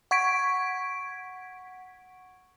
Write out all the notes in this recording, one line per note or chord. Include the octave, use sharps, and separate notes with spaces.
F#5 C#6 G#6 B6 D7